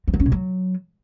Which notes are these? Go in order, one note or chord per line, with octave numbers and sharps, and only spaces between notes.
F3
F#3
C#4
B2
F#3